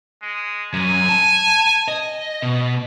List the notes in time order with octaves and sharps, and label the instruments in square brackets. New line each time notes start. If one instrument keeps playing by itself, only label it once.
[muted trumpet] G#3
[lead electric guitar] F#2 [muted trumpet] G#5
[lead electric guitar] A5
D#5
B2